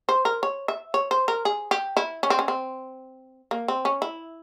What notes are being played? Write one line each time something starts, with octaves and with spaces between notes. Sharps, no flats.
C5
A#4
C#5
E5
C#5
C5
A#4
G#4
G4
E4
C#4
C4
C#4
C4
A#3
C4
C#4
E4